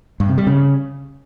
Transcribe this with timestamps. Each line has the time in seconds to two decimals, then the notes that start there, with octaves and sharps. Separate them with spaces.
0.20 G2
0.29 C3
0.38 G3
0.47 C#3